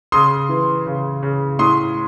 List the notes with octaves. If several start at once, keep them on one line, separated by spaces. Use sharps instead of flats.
C#3 C6 D#6
E3
C#3
C#3
A2 C6 D#6